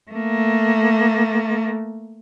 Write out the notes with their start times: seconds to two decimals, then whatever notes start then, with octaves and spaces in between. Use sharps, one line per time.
0.11 A3 A#3